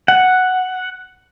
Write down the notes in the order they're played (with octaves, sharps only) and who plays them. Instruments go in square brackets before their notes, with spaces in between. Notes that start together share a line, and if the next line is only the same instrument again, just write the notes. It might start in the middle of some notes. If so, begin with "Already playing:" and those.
[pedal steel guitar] F#5